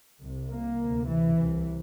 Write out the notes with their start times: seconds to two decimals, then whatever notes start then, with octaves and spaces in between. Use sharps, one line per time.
0.21 C2 C3
0.50 A#3
0.80 D2 C3
1.08 E3
1.37 C2 C3